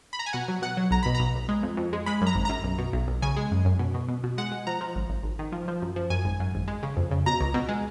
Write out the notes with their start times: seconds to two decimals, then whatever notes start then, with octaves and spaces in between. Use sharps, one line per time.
0.13 B5
0.19 A#5
0.26 G#5
0.33 B2 F#5
0.48 F#3
0.62 B2 F#5
0.77 F#3
0.91 B1 A#5
1.03 B2 B5
1.15 A#5
1.20 B1
1.35 B1
1.49 G#3
1.63 F2
1.77 F2
1.93 G#3
2.06 G#3 B5
2.21 F#2
2.27 A#5
2.35 G#1
2.45 F#2 A#5
2.64 B1
2.78 B2
2.93 B1
3.07 B1
3.22 C#3 G#5
3.37 G#3
3.51 F#2
3.65 F#2
3.79 B2
3.94 B2
4.08 B2
4.23 B2
4.38 G#3 F#5
4.52 G#3
4.67 F3 A#5
4.81 F3
4.95 G#1
5.09 G#1
5.23 G#1
5.39 D#3
5.52 F3
5.68 F3
5.82 F#2
5.96 F3
6.10 F#2 G#5
6.25 G#1
6.40 F#2
6.54 G#1
6.68 G#3
6.83 C#3
6.97 F2
7.11 C#3
7.26 B2 A#5
7.41 C#2
7.54 B2
7.69 G#3